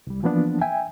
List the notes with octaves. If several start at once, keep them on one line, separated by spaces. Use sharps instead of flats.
C2 G3
E3 F3 A#3 B3 D4
E5 G5 G#5